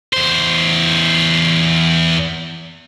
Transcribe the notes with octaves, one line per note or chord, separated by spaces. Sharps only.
E2 C5